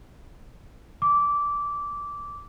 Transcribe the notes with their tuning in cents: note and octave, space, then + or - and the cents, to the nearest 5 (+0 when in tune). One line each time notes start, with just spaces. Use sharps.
D6 -15